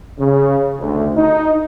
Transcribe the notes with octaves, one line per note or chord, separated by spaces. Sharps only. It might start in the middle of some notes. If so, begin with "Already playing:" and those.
C#3
D2
D#4